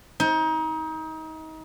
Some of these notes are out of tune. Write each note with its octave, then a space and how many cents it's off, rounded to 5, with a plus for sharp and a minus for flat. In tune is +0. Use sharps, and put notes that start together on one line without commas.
D#4 +30